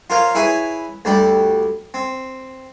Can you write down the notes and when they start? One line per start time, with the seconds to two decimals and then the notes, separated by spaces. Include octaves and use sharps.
0.10 F4 A#4 C5 C#5 F5
0.35 E4 G#4 B4 C#5 G#5
1.05 D2 G3 D5 G5
1.94 C4